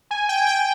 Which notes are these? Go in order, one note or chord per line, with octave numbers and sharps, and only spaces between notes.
G#5
G5
G5